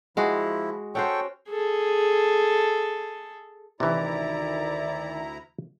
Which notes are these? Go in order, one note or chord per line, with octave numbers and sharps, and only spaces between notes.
F3 G#3 E4 F#4 G#4
C#4 F#4 A4 C5 G5 C#6
G#4 A4
D2 C3 D#3 E3 E4 D5 A#5